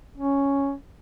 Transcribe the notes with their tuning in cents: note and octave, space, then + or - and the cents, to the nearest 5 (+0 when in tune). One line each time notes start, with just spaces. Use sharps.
C#4 +0